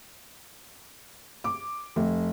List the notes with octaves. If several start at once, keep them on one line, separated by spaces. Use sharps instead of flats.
D6
F1